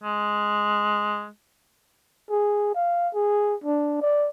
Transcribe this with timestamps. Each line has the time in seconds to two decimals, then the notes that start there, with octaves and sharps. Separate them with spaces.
0.04 G#3
2.30 G#4
2.75 F5
3.14 G#4
3.64 D4
4.01 D5